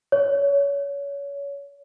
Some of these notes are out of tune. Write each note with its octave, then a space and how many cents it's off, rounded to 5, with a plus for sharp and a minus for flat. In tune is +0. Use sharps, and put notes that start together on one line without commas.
C#5 +25